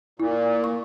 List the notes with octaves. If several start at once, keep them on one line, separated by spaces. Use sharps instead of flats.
A#2 E4
C#6